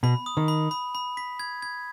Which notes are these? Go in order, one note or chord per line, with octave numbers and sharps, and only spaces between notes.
B2 B5
D#6
D#3
B5
B5
B5
B6
G#6
G#6